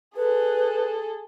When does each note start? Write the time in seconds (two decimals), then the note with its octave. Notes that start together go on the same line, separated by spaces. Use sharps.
0.16 G#4 A4 B4